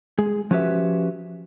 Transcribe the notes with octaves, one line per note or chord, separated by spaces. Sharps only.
G#3 G#4
F3 C#4 F#4 G4 B4 E5